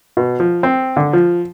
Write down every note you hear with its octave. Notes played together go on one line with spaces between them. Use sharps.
B2
F3
C4
D3
F3